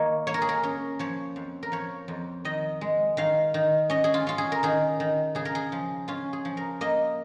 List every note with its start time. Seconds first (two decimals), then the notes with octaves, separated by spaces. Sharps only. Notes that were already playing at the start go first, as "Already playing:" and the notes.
Already playing: D#3 A#3 C#5 D#5
0.27 A#3 C#5
0.34 A#4
0.42 G#4
0.49 A#4
0.64 C#4
0.99 F3 C#5
1.36 F2
1.63 A#4
1.72 F3 C#5
2.08 F2
2.45 D#3 D#5
2.81 G#3
3.17 D#3 F5
3.54 D#3
3.90 C#4 D#5
4.04 G#4
4.14 F4
4.27 C#4 F4
4.38 G#4
4.52 A#4
4.63 D#3 G#4
5.00 D#3
5.35 C#3 G#4
5.45 A#4
5.55 G#4
5.72 F3
6.08 C#4 F4
6.33 G#4
6.45 F3
6.57 A#4
6.81 A#3 D#5